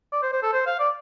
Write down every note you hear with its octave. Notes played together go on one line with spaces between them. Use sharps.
D5
C5
C5
A4
C5
F5
D5